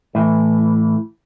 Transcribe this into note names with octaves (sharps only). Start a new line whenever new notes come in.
A2 E3